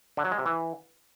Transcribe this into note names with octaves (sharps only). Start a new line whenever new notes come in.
D3
F#3
G#3
C3
E3